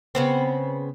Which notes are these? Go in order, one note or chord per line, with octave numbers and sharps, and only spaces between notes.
C#3 B3 C4